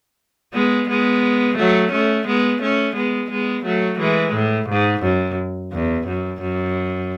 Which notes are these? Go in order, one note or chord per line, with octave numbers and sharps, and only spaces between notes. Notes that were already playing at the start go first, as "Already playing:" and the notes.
G#3 B3
G#3 B3
F#3 A3
A3 C#4
G#3 B3
A3 C#4
G#3 B3
G#3 B3
F#3 A3
E3 G#3
A2
G#2
F#2
E2
F#2
F#2